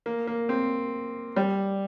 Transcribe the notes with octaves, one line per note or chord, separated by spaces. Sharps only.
A#3
A#3
C4
G3